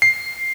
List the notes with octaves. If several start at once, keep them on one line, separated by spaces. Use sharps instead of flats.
C7